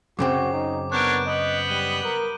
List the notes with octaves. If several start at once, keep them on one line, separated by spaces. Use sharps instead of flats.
F#2 C#3 C4 F#4 D6
D#4
B3 D4 A#4 C#5 F#6 G6 D7
B3 D#5
G3 D#7 G7
A#4